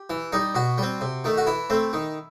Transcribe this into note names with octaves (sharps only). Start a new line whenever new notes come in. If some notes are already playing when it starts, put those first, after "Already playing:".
Already playing: G4
E3
G3 D#4
B2 F#4
G3 C4
C3
D#3 A3
F#4
E3 E4
A3 C4
D#3